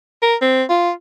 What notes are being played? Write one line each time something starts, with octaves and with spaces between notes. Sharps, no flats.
A#4
C4
F4